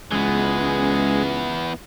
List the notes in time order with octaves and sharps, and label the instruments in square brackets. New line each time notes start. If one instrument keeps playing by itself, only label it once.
[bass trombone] C#2 [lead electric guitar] E3 B3 [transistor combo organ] G#3 [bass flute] C#4